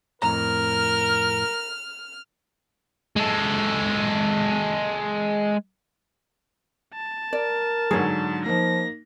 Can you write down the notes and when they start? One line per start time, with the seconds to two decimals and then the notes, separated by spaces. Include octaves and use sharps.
0.22 F2 A2 A#4 A#5 F6
3.16 G#3 A4
6.94 A5
7.33 A#4 D5
7.91 G#2 D3 F#3 G#4 C#5
8.46 F3 A#3 D#4 A#6